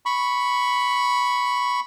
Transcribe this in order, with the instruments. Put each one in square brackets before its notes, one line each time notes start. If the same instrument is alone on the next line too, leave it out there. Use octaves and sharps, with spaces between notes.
[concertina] B5 C#6